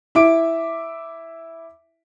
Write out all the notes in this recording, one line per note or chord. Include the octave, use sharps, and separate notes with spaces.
E4 E5 D6 D7